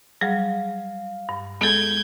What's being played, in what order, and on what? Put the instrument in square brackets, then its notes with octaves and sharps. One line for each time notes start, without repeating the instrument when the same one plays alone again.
[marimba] F#3 G3 G#4 [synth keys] F5
[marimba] G2
[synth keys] G#3 [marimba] B3 A4 [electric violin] G6 G#6